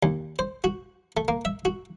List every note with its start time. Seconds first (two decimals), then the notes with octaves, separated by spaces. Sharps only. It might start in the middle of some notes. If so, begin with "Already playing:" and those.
0.03 D#2
0.39 C5
0.64 F#4
1.17 A3
1.28 A#3
1.45 E5
1.65 F#4